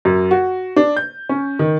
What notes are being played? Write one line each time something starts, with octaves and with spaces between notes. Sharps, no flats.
F#2
F#4
D4
G6
C#4
D#3